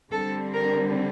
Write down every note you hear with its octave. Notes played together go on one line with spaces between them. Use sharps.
D3 G3 C4 A4
A#4